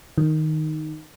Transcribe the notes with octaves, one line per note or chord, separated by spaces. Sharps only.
D#3